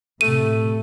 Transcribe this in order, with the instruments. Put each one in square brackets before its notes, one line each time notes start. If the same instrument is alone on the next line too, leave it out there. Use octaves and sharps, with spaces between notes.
[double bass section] A2 C3 [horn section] A3 [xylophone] D#7